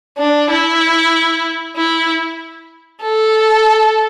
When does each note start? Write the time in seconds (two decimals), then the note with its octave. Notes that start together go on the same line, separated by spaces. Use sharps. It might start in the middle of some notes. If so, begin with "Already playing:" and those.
0.18 D4
0.50 E4
1.76 E4
3.02 A4